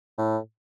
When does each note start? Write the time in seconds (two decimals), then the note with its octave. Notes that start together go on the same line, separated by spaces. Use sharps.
0.18 A2